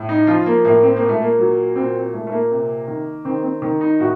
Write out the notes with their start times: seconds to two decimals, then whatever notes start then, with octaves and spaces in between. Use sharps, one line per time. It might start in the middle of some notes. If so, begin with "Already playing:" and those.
Already playing: A2
0.09 D#4
0.27 F3 F4
0.46 A#3
0.65 A2 A#3
0.83 C4
0.96 A#3
1.02 A#2
1.09 A3
1.22 A#3
1.39 F#3
1.76 A#2 C4
2.13 A#2 A3
2.27 A3
2.32 A#3
2.51 C3
2.87 D#3
3.25 D#3 C4
3.44 C4
3.62 D#3
3.81 D#4
4.00 A2 F#4